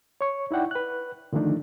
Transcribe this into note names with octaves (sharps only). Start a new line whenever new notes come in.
C#5 C#6
D#4 E4 D5 F#5 G5
B4 F#6
D3 D#3 F3 A3 D4 D#4